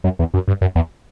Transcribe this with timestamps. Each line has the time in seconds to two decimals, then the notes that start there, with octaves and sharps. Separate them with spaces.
0.04 F#2
0.19 E2
0.34 F#2
0.48 G2
0.61 F#2
0.75 E2